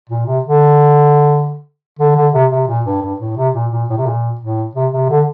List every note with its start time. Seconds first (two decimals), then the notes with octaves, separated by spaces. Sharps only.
0.10 A#2
0.26 C3
0.44 D3
1.99 D3
2.16 D3
2.34 C3
2.51 C3
2.68 A#2
2.85 G2
3.02 G2
3.20 A2
3.37 C3
3.54 A#2
3.72 A#2
3.89 A2
3.97 C3
4.06 A#2
4.41 A2
4.75 C3
4.92 C3
5.09 D3